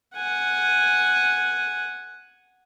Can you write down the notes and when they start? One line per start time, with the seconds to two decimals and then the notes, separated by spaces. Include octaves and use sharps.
0.16 F#5 G#5